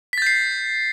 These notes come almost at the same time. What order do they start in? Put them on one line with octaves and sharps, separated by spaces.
B6 A6 G6 C7